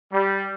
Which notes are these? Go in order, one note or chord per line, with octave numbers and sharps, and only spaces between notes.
G3